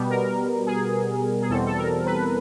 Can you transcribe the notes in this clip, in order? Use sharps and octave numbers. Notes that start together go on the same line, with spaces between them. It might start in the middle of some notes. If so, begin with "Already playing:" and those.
Already playing: B2 G3 B3
A#4
G#4
G#4
E2 B2 G3 C4 A4
A4
A#4
B4